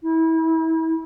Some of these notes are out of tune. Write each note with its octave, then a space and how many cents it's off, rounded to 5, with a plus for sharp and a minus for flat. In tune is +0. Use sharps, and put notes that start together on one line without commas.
E4 -30